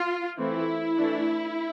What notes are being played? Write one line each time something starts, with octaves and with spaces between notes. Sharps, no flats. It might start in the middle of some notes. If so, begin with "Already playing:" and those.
Already playing: F4
E3 A3 C4 E4
E3 A3 D4